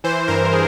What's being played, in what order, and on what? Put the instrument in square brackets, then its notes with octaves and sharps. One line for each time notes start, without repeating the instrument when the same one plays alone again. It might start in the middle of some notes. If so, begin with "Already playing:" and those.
[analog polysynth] E3 C5
G2 A#4
E3 G#4